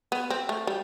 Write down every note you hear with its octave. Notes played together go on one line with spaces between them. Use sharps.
B3
C4
A3
G3